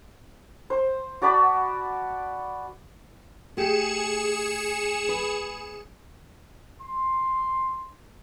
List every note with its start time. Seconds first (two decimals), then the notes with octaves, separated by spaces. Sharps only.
0.70 C5
1.22 F#4 D5 A5 B5
3.57 A3 G4 G#4 C#7 E7
5.09 B4
6.81 C6